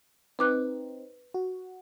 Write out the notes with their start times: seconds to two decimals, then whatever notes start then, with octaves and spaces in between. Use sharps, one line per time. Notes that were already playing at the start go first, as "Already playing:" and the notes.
0.39 C4 D#4 B4 D6 F#6
1.34 F#4